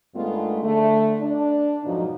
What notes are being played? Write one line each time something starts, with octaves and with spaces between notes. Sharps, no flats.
G2 D#3 G#3 A3 B3 F4
D3 A3
D4
F2 G#2 B2 F3 F#3 D#4